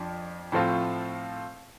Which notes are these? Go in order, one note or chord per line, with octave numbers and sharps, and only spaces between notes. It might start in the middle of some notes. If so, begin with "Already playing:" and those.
Already playing: F2 F3 D4
A2 F3 A3 C4 F4